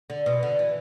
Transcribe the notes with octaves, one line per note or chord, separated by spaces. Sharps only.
D3
B2
D3
E3